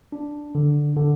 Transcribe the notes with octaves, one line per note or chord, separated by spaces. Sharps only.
D4
D3
D3